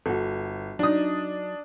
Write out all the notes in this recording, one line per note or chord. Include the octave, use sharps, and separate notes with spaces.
G1 F#4 A4
F#3 D4 D#4 D#6